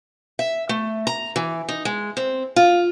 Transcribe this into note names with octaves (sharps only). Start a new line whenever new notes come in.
E5
A3
A#5
E3
D#4
G#3
C4
F4